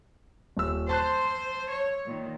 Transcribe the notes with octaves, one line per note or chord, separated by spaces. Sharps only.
D#1 E6
C5 A5 C6 F#6
C#5
A#2 D#3